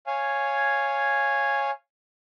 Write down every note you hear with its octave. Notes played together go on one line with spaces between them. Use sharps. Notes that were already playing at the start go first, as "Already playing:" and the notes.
C#5 F5 G#5